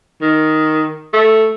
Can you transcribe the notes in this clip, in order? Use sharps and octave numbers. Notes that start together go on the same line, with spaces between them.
D#3
A3